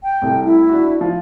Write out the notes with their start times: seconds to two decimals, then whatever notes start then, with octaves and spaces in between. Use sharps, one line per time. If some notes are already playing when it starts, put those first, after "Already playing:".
0.03 G5
0.22 C2 C3 A3
0.45 E4
0.69 D4 F#4
1.01 F3